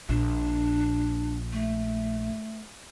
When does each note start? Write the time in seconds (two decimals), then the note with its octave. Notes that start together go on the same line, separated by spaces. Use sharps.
0.09 A#1 A#2 D4
1.53 A3